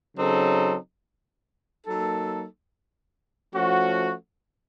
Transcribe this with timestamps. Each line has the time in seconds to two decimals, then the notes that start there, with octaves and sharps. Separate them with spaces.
0.17 C#3 F#3 C4 D#4 A4
1.85 F#3 A#3 D#4 A4
3.54 F3 A3 C#4 F#4